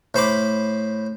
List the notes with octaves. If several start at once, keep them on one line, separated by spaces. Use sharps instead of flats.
A2 C5 B5 D6